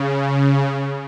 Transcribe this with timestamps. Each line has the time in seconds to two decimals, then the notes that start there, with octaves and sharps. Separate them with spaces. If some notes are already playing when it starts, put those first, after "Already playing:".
Already playing: C#3